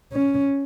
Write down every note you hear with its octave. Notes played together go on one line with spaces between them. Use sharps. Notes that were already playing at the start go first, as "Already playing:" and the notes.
C#4